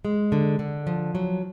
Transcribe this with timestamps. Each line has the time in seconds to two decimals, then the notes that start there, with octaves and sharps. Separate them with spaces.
0.05 G#3
0.32 D3
0.59 D3
0.87 F3
1.15 F#3